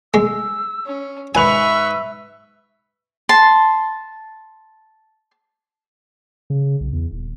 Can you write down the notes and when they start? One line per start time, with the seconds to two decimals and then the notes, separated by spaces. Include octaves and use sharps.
0.14 G#3 E6
0.86 C#4
1.35 G#2 B4 E5 G#5 C#6 E6 F7
3.29 A5 C6
6.50 C#3
6.80 B1
6.93 E2
7.11 D#1